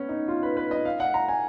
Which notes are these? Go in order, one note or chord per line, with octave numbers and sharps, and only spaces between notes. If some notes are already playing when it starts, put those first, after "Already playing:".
Already playing: B3 C#4
D#4
F4
B4
B4
D#5
F5
F#5
A#5
G#5